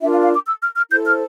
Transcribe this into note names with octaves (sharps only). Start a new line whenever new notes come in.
D4 F4 A#4 E5
F5
F5
D6
E6
F6
F6
E4 A4 C5 G6
F6